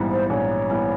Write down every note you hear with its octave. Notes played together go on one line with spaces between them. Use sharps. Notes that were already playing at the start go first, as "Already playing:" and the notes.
Already playing: A#1 G#2 E3 G3 B3
C5
A#1 C#5
E3 G3 B3